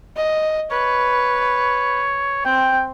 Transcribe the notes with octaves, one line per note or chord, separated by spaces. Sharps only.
D#5
B4 C#5
C4 G5